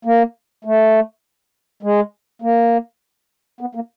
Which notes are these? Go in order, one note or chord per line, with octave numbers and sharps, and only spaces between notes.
A#3
A3
G#3
A#3
B3
A#3